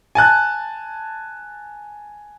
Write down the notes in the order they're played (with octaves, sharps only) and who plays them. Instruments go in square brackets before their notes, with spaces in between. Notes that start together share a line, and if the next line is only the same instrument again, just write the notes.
[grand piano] G#5 A5 F#6